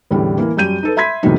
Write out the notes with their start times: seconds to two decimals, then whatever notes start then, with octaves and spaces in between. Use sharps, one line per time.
0.11 A1 E2 A2 D3 G3
0.38 E3 A#3
0.57 F#2 G3 G6 D#7
0.83 D#4 A4 B4
0.97 E5 B5 C6 G#6 B6
1.23 E2 A2 C3 F#3 A#3 D#4